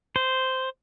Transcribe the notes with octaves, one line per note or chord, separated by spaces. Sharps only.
C5